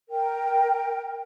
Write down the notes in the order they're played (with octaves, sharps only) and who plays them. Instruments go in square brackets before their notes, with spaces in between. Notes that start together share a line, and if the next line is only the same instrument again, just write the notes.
[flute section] A#4 G5